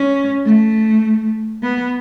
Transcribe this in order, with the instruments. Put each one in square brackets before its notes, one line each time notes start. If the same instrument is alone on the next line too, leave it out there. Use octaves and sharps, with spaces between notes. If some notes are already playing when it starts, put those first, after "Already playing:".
Already playing: [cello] C#4
A3
B3